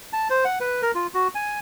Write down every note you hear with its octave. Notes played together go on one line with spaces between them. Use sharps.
A5
C5
F#5
B4
A#4
F4
F#4
G#5